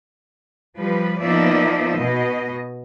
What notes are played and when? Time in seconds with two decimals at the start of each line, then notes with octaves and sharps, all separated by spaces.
0.78 F3 G3 B4
1.22 F3 A#3 B3 D#4 D5 E5
1.99 B2 D#5